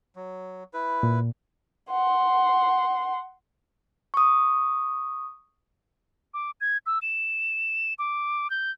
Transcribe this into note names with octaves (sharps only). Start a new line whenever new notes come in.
F#3
E4 B4
A#2
F#5 C6
C#6 D#6
D6
G#6
E6
E7
D6
G6